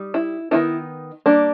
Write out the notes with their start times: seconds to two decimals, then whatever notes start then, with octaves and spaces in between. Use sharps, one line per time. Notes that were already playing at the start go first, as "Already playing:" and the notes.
Already playing: G3 D#4
0.14 E4
0.51 D#3 G3 B3 D#4 E4
1.26 G3 A#3 D4